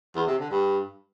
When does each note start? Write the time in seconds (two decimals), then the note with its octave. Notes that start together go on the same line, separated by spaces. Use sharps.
0.15 E2
0.27 C3
0.39 D3
0.51 G2